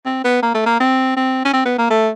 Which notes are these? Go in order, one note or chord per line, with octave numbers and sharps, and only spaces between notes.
C4
B3
A#3
A3
A#3
C4
C4
C#4
C4
B3
A#3
A3